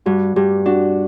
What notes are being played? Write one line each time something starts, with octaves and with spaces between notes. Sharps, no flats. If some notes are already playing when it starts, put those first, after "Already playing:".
G2 F#4
G2 G4
D4 F#4